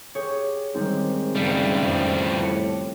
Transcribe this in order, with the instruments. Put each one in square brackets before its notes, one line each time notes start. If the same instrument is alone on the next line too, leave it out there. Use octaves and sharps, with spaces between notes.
[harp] G4 G#4 C#5
[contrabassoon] G#2 [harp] D#3 G3 C4
[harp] F#1 [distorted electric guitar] A2 G3
[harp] F2
[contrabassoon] A2 [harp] G3 C#7